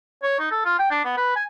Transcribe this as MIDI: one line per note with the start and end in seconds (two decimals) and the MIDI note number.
0.23 0.39 73
0.40 0.50 63
0.51 0.65 69
0.65 0.74 65
0.79 0.89 79
0.91 1.02 62
1.05 1.15 59
1.17 1.35 71
1.36 1.44 80